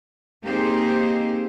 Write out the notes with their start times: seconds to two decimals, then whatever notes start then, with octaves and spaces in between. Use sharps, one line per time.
0.44 A#3 C4 D#4 G4 G#4 C5